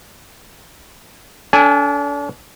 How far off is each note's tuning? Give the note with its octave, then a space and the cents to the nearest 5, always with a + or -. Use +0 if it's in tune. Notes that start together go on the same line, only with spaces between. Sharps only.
D4 -40 A4 +0 G#5 -10